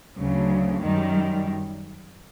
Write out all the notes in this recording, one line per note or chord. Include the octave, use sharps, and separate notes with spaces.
D2 C#3 F#3
F#2 D#3 G3